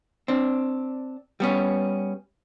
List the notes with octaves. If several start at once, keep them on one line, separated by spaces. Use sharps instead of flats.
C4 D4
G3 B3 C#4